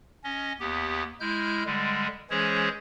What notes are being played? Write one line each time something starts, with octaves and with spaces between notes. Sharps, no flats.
C#4 D#5
D#2 B3 G4
G#3 E4 F6 G6
D3 G3 G#3
E3 G#3 C#4 G#4 C5 C#5